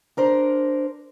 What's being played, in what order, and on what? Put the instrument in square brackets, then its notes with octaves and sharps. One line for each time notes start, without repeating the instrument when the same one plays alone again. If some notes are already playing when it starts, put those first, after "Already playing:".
[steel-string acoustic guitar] D4 A#4 C5